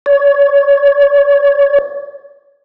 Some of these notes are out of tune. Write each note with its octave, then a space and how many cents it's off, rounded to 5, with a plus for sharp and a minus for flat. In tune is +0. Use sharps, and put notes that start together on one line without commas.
C#5 +30